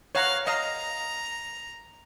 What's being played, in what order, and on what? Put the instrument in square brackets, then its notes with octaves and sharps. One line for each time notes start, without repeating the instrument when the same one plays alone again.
[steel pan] C#5 F#5 A#5 [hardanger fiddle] F5
[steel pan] D#5 F5 [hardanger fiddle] A#5